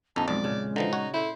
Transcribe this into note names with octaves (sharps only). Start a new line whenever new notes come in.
A#1 F2 D#4 A5
B1 F2 G#3 D5
A#2 C#3
D3 E3 F3 D#4
F#4 C#5
E4 A4 C5